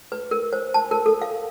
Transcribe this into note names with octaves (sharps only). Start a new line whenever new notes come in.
B4
A#4
C5
A5
A#4
A4
F5